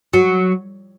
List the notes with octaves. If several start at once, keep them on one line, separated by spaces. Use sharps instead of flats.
F#3